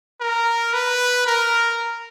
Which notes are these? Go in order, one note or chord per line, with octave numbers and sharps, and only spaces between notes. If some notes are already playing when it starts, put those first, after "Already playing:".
A#4
B4
A#4